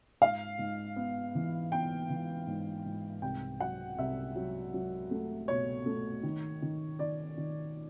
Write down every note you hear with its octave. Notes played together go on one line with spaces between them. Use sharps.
G#2 F5
G#2
B3
E3
B3 G5
E3
G#2
G#2
C2 G5
F#3 F#5
C2 E5
F#3
F#3
A3
B2 C#5
A3
D#3
D#3
D#3 D5
D#3